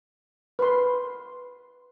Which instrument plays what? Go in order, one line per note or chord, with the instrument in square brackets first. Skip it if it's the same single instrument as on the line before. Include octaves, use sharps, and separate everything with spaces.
[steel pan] B4 C6